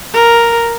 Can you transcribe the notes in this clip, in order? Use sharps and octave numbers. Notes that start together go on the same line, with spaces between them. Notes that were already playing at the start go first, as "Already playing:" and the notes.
A#4